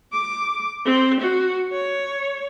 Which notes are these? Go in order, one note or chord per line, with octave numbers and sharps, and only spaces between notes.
D6
C4
F#4
C#5